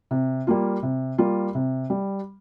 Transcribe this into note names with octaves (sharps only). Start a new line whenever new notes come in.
C3
G3 A#3 F4
C3
G3 A#3 F4
C3
G3